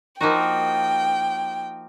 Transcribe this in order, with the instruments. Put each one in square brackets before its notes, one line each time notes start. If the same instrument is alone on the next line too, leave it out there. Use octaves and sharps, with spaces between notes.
[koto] F3 A#3 D#4 F#4 [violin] G5